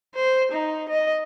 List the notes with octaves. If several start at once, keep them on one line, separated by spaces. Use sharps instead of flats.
C5
D#4
D#5